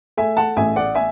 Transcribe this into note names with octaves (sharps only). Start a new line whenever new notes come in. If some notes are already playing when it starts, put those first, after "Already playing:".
A3 E5 G#5
F#5 A5
A1 E5 G#5
D5 F#5
E5 G#5